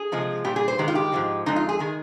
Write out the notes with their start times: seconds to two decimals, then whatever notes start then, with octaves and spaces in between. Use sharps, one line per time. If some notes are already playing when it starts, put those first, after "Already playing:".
Already playing: G#4
0.12 C3 F3 G#3
0.44 A#2 G3 G4
0.56 G#4
0.68 C5
0.78 G2 D#3 G#3 G4
0.88 F4
0.95 G4
1.12 G#2 F3 G#3
1.46 F2 D3 G#3 D#4
1.56 F4
1.69 G#4
1.79 D#3 G#3 G#4